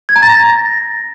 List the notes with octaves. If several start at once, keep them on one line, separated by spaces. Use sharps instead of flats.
G#6
A#5
A6
A#6